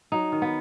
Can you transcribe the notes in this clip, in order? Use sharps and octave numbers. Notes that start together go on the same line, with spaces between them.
F#3 D#4
D#3
B3